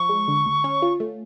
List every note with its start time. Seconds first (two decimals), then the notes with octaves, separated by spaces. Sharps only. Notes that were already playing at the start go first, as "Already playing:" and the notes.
Already playing: F3 C#6
0.09 G#3
0.28 D3
0.46 D2
0.64 C#4
0.82 F4
1.00 A3